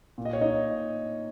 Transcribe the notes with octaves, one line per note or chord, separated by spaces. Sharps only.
A#2
D#5
C#5
D#4 D#5